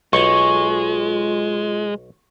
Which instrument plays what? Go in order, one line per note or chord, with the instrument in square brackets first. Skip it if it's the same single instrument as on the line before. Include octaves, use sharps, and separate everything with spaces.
[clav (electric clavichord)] B1 [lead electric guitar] G#3 [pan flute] F4 [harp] C#6